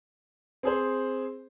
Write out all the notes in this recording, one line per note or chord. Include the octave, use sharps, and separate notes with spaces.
C4 G#4 C5